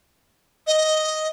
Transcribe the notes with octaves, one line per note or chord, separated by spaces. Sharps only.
D#5